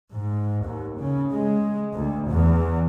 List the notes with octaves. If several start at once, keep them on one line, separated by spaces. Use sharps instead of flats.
G#2
D#2
C#3
G#3
D2
E2